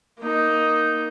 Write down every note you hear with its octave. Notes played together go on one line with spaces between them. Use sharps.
A#3 D#4